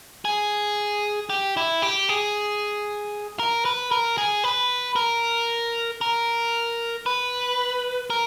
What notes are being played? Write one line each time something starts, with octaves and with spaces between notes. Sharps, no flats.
G#4
G4
E4
G4
G#4
A#4
B4
A#4
G#4
B4
A#4
A#4
B4
A#4